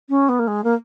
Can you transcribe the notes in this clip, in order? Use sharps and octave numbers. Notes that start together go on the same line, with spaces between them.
C#4
B3
A#3
G#3
A#3